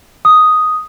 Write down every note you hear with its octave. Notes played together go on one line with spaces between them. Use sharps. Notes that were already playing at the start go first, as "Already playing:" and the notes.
D#6